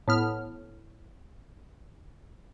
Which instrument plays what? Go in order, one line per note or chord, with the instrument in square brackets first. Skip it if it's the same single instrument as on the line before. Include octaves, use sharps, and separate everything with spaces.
[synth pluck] A2 B3 F6